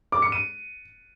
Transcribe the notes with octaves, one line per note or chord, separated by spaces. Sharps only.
D6
C#7
D#7